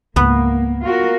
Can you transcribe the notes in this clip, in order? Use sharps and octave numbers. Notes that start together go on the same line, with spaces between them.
C#2 G#2 A#3 B3 B4
F4 F#4 A#4